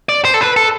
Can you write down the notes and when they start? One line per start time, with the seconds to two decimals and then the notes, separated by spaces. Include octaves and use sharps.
0.09 D5
0.25 C5
0.34 A4
0.41 B4
0.56 A4